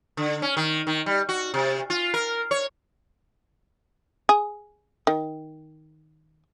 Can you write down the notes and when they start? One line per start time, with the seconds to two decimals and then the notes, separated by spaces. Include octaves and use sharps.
0.17 D3
0.42 C#4
0.57 D#3
0.87 D#3
1.06 G3
1.29 F#4
1.54 C3
1.90 F4
2.14 A#4
2.51 C#5
4.29 G#4
5.07 D#3